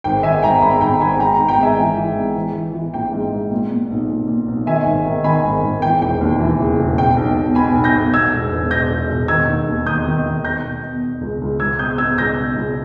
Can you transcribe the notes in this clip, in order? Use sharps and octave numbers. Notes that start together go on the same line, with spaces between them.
G#1 G5
D#3 E5 G#5
G#1 G5 A#5
G#1 G#5 B5
G#1 G5 A#5
G#1 G#5 B5
G#2 G5 A#5
G5 A#5
G#1
G5 A#5
G#2 E5 G#5
E3
E3
G#2
E3
E3
E3
A#1 G5
G#2
G#2
A#2
A#2
B1
A#2
A#2
B1
D#3 E5 G#5
G#1
D#3
D#3 G#5 B5
G#1
G#1
E3 G5
E1 G5
D#2
E3
C#3
E1
B2 G5
B1
B2
B2 G#5 B5
B1
G6 A#6
B1
B2 E6 G#6
E1
E1
B2 G6 A#6
E1
E1
D#3 E6 G#6
D#2
D#2
D#3 D#6 G6
D#3
D#3
B2 G6 A#6
B2
B2
B2
C#2
C#2
C#2 E6 G#6
B2 D#6 G6
B2 E6 G#6
C#2 G6 A#6
B2
C#2